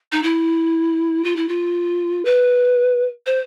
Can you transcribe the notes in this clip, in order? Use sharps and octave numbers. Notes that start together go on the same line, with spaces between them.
D#4
E4
F4
E4
F4
B4
C5